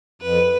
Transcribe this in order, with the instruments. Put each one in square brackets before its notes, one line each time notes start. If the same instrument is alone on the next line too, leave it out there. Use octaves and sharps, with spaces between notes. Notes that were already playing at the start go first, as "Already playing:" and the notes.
[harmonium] F2 [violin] B4